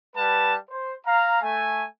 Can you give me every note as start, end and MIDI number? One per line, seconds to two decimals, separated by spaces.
0.16 0.55 55
0.16 0.55 71
0.16 0.55 78
0.16 0.55 81
0.70 0.93 72
1.05 1.38 77
1.05 1.38 82
1.42 1.84 57
1.42 1.84 80